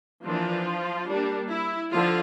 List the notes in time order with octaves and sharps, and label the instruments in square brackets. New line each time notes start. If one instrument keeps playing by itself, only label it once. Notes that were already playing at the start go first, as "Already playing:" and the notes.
[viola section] E3 F3 A#3 D4 F4
G3 A#3 D4
E4
D3 F3 F4